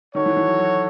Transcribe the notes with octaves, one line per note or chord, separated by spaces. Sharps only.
D#3 F#4 A4 C#5
E3
E3
F#3
F#3